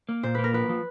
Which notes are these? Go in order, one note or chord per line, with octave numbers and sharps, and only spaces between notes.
A#3
A#2 C5
A#3 B4
A#4
F3 B4
F3